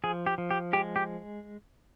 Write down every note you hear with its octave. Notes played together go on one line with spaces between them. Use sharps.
F3 G#4
G4
F3
G4
G#3 G4
G4